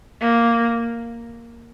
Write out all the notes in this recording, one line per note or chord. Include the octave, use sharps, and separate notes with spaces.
A#3